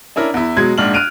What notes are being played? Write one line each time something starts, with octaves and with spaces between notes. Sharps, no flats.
C#4 D4 E4 A#4
E2 E4
B2 F#3 G#3 G#6
A#1 G#2 D4 F6 F#7
F6 F#6 D7 D#7 F7